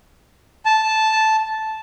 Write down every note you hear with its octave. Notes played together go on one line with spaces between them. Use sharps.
A5